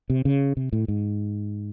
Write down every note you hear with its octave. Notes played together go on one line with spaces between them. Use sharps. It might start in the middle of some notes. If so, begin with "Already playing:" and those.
C3
C#3
C3
A2
G#2